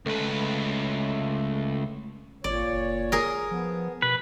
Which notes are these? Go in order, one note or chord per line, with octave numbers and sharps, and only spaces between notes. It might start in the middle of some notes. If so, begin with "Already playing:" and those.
C#2 A3 B4
G#1 A#2 C#5 D5
F#1
G#4 A#4
F3 B3
B2 B4